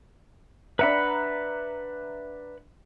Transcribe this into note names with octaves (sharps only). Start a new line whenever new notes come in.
D4 B4 E5 F#5 A#5 B5